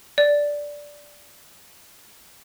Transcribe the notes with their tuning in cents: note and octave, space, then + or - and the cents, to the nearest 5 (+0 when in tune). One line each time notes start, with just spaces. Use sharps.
D5 -5